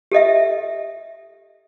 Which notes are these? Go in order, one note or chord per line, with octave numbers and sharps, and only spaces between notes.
G4 A4 D#5 E5